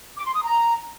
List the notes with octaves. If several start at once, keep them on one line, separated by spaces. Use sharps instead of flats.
D6
C6
D#6
A#5